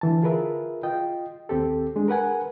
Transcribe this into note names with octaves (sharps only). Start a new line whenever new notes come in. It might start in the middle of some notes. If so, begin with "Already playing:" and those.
D3 E3 A5
F4 G#4 A#4 B4 E5
F4 D#5 G5
D#2 C4 G4 A4
G#3 D4 G#4
A#4 B4 F#5 G#5